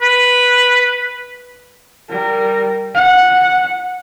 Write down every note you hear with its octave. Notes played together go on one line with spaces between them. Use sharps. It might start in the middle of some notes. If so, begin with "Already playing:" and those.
B4
G3 A#4
F#5